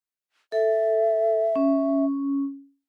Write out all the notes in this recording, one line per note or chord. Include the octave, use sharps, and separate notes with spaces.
A4 E5
C#4